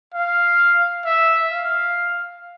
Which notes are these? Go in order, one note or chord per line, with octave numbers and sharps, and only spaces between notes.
F5
E5
F5